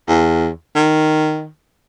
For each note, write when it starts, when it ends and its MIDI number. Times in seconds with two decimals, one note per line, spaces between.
0.09 0.49 40
0.75 1.47 51